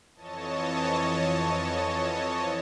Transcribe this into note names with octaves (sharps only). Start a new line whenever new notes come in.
F2 E3 C#5 D#5 A5